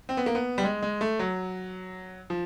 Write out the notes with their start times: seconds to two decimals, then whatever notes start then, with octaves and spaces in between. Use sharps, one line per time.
0.09 C4
0.17 B3
0.26 A#3
0.35 B3
0.58 G3
0.64 G#3
0.82 G#3
1.01 A3
1.19 F#3
2.30 F3